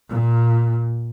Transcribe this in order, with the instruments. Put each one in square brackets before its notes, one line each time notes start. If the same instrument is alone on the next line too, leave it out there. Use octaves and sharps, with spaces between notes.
[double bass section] A#2